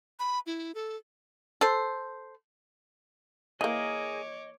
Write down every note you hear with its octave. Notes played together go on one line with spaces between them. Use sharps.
B5
E4
A4
A4 C5
E3 A#3 G#4 A#4 C#5 D#5 D6